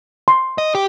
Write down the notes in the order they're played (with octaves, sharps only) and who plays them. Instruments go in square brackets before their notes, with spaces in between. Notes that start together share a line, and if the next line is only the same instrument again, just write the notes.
[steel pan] C6
[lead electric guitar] D#5
G4